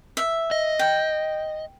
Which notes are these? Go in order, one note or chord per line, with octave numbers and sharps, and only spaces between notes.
E5
D#5
G5